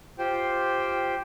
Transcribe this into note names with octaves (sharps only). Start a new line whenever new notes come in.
F4 G4 C5 G5